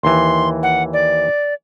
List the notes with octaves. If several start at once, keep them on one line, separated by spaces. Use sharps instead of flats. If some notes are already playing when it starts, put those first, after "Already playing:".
D#2 E3 C6
F#5
D5